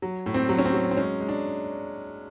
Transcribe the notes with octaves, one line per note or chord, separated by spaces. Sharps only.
F#3
A2
C4
F#3
C#4
C4
F#3
C4
G#3 C#4
G#3
D4